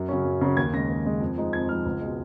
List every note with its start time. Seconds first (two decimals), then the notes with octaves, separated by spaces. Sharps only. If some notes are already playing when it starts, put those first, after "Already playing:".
Already playing: F#2
0.09 C#3 F#3 C#4
0.25 F#2
0.41 C#3 F#3 C#4
0.57 D#2 G#6
0.74 C#3 G#3 A#6
0.89 D#2
1.06 C#3 G#3
1.21 F2
1.37 F3 G#3 D#4
1.53 F2 G#6
1.69 F3 G#3 D#4 F6
1.86 C#2
2.01 B2 G#3